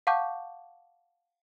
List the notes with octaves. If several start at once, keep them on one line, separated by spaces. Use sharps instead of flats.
F5 F#5 A5 C#6 D6 G6